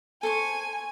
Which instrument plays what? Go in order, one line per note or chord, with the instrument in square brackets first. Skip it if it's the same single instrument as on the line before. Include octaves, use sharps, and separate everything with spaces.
[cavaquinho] A4 C5 C#6 [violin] G#5